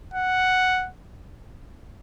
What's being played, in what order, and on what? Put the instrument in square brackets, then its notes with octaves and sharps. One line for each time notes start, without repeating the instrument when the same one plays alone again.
[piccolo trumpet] F#5